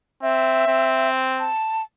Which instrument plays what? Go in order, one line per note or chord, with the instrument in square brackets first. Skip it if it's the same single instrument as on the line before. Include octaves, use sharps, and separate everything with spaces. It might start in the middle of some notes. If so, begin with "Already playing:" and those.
[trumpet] C4 [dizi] E5
[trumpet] C4
[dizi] A5